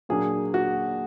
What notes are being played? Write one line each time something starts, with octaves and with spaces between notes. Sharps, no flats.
A#2 F#3 A#3 D4 G#4
F#4